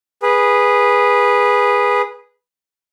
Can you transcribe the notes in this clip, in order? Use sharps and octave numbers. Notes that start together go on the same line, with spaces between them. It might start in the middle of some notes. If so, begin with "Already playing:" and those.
G#4 B4